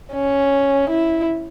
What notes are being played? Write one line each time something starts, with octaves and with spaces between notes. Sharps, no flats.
C#4
E4